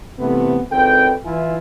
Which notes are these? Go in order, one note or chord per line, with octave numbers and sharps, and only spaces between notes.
C3 E3 A3 B3
G#1 C#2 C4 A4 B4 G5
E3 E4 F4 E5 G#5